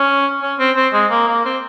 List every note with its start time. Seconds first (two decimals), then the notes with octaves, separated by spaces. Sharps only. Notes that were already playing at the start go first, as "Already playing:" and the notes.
Already playing: C#4
0.42 C#4
0.59 C4
0.76 C4
0.93 G#3
1.11 A#3
1.28 A#3
1.45 C4